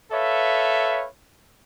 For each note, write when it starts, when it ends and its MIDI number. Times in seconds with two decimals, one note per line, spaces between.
0.12 1.05 69
0.12 1.05 71
0.12 1.05 73
0.12 1.05 76
0.12 1.05 77